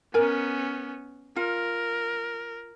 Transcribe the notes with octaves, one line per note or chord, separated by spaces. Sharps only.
B3 C#4 A#4 G#5
F4 A#4